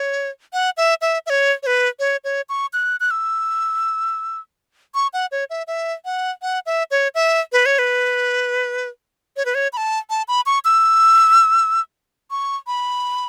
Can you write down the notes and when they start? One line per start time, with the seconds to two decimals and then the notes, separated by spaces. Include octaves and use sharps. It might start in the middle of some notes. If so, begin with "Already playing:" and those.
Already playing: C#5
0.53 F#5
0.77 E5
1.01 E5
1.26 E5
1.30 C#5
1.63 C#5
1.67 B4
2.00 C#5
2.24 C#5
2.49 C#6
2.73 F#6
3.00 F#6
3.11 E6
4.94 C#6
5.13 F#5
5.32 C#5
5.50 E5
5.67 E5
6.05 F#5
6.42 F#5
6.66 E5
6.91 C#5
7.15 E5
7.52 B4
7.66 C#5
7.79 B4
9.37 C#5
9.45 B4
9.55 C#5
9.73 B5
9.77 A5
10.10 A5
10.28 B5
10.46 C#6
10.65 E6
12.31 C#6
12.67 B5